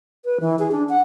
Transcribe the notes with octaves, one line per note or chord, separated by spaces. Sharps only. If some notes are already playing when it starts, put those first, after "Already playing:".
B4
E3
G#4
D4
F#5